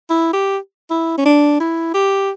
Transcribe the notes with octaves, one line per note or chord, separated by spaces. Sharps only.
E4
G4
E4
C#4
D4
E4
G4